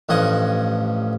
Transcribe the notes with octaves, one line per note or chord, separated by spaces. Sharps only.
A1 G2 F3 D#5 F#5 G#5